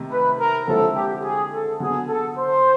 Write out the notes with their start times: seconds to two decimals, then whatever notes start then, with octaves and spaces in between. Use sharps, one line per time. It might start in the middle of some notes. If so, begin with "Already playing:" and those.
Already playing: C3 D#3 A3
0.11 B4
0.40 A#4
0.68 D3 F3 G#3 C4 E4 A4
0.95 G4
1.24 G#4
1.52 A4
1.80 D3 F#3 B3 G#4
2.09 A4
2.37 C5